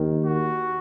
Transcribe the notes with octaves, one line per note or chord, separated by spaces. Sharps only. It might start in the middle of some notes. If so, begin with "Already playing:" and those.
Already playing: D#2 D#3
F#4